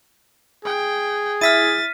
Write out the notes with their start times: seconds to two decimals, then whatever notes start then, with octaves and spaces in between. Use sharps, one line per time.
0.65 G#4 G5
1.41 E4 E5 F6 A6 B6 D#7